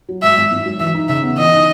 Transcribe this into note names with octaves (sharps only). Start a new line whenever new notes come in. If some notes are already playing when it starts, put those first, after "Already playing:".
F#3
G#2 E5
G#1
G#1
F#3
E3 E5
D#4
C#3 E5
B3
E3 D#5
D#4